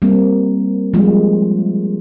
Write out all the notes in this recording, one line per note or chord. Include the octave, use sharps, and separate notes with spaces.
G3 A#3 C4
F3 G3 G#3 A#3 F4